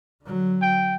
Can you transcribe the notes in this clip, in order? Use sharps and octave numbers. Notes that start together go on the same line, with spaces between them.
D3 F#3
G5